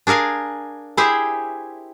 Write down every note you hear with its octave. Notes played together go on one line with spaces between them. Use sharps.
D4 G#4 A#4 F5 G#5
E4 G4 G#4 C5 E5